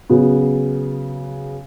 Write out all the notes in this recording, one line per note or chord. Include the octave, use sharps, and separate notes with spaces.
C#3 F#3 B3